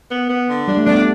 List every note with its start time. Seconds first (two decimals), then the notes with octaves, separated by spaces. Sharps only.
0.11 B3
0.29 B3
0.48 D3
0.67 G3 D4
0.77 A3
0.86 G3 B3 D4